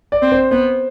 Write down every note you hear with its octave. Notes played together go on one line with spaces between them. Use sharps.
D5
C4
C5
B3 C5